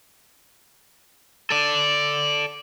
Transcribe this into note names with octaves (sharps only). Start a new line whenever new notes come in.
A4 D5